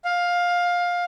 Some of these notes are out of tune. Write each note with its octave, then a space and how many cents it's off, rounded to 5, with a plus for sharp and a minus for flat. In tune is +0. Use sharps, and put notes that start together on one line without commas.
F5 +15